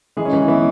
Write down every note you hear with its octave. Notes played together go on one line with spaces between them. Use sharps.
E3 G#3 G#4
C#4
E3 D#4
E3 B3 E4